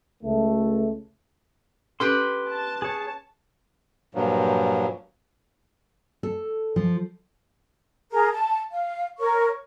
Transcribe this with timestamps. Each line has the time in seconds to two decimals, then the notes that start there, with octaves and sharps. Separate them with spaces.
0.23 C#2 A3
2.00 C#4 G4 A4 B4 C6 D6
2.49 A5
2.82 G#4 C#5
4.15 G2 A#2 F3 F#3
6.23 A4
6.76 F3
8.12 G#4 A#4 A#5
8.33 A5
8.71 F5
9.19 A#4 C#5 C#6